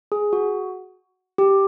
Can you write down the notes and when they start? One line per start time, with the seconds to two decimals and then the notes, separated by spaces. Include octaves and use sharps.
0.12 G#4
0.33 F#4
1.38 G4